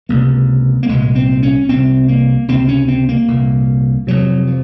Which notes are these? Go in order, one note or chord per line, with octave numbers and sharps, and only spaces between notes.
C#2 C3 A#3
A#3
C2 A#2 G#3
C4
C#4
C2 C3 C4
A#3
C#2 C3 C4
C#4
C4
A#3
C2 A#2
F2 C3 F#3
F3